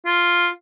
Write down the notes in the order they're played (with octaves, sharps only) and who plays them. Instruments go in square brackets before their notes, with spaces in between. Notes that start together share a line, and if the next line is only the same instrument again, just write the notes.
[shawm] F4